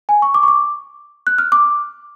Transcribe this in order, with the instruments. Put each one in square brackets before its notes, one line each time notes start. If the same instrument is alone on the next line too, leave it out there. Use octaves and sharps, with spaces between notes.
[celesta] G#5
C#6
D6
C#6
D6
F#6
F6
D6